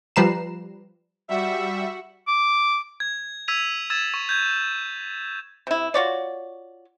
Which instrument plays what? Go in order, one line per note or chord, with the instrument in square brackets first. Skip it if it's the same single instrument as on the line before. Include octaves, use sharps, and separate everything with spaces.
[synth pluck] F3 G3 B4 A#5 C7 E7
[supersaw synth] G3 E5 [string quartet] F#4
[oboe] D6
[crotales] G#6
E6 G#6 B6 D#7 F7
E6 G#6 A6 E7
C#6
G6 G#6
[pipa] C3 E4
F4 F#4 C#5 D5